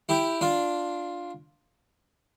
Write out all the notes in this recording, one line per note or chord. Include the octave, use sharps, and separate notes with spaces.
E4 G4
D4 F4